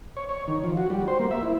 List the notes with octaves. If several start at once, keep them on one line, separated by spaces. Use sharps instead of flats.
C#5
C#5
D#3
F3
F#4
G3
C5
A#3
E5
E4